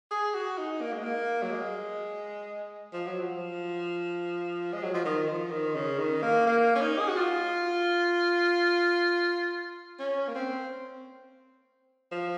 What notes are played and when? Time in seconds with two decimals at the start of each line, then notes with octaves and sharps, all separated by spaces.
0.11 G#4
0.34 F#4
0.58 D#4
0.81 A#3
0.92 G#3
1.03 A#3
1.43 F#3
1.52 G#3
2.93 F3
3.07 F#3
3.20 F3
4.73 G#3
4.83 F#3
4.94 F3
5.05 D#3
5.29 F3
5.51 D#3
5.75 C#3
5.99 D#3
6.23 A#3
6.46 A#3
6.75 C#4
6.82 D#4
6.99 G#4
7.08 F#4
7.17 F4
9.99 C#4
10.28 A#3
10.35 C4
12.11 F3